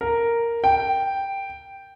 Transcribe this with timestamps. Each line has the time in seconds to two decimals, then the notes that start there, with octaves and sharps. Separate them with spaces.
0.01 A#4
0.64 G5